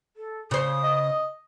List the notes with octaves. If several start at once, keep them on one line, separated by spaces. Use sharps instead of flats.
A4
C#3 C5 D#6
D#5